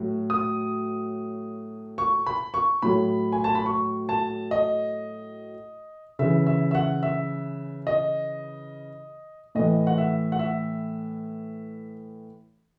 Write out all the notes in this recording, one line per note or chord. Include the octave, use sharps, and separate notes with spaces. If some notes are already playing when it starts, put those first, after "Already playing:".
Already playing: A2 F#3
D#6
C#6
B5
C#6
A2 F#3 B5
G#5
A5
B5
C#6
A5
D#5
C#3 E3 E5
E5
E5
F#5
E5
D#5
A2 E3 D#5
F#5
E5
F#5
E5